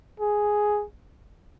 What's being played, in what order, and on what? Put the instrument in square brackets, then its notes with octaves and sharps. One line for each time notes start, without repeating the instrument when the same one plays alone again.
[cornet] G#4